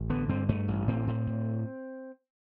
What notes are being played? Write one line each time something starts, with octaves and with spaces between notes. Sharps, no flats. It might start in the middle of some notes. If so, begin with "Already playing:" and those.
Already playing: A1
D3 B3
G2 C4
G2 A3
A1
A2 C4
A2
A2